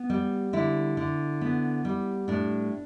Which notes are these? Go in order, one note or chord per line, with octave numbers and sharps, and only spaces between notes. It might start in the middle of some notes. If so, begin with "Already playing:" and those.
Already playing: B3
G3
D3 E4
D3
B3
G3
A2 D4